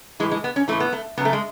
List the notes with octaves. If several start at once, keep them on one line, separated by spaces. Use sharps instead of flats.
A2 E3 G#3
G#3
B3
C#4
A2 E3 A3
B3
A3
C#3 F#3 A3 B3
G#3